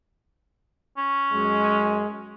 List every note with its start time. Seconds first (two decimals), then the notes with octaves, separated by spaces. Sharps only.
0.98 C#4
1.33 F#2 G#3